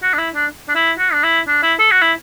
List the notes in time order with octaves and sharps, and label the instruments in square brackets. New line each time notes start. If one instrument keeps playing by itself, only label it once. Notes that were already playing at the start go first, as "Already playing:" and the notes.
[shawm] F#4
D4
E4
D4
D4
E4
F#4
D4
E4
D4
E4
A4
F#4
E4